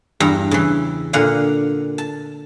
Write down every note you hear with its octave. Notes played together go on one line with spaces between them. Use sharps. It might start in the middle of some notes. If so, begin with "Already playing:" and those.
E2 G2 A#5
C#3 E3
A#2 D3 F5 F#5 G#5
A5